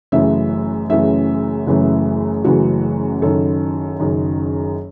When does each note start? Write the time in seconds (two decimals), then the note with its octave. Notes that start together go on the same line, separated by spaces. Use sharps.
0.12 F#1 F#2 C#3 E3 A3 E5
0.90 F#1 F#2 C#3 E3 A3 E5
1.67 F#1 F#2 C#3 E3 A3
2.44 F#1 F#2 C#3 E3 A3 F#4
3.22 F#1 F#2 D#3 A4
3.99 F#1 F#2 D#3